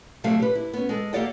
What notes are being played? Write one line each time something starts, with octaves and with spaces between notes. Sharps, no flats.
C3 F#3 G3 A3 F5
G4 B4
E4
B3 C#4
G#3 A4
A#3 G4 A4 D5 F#5 G5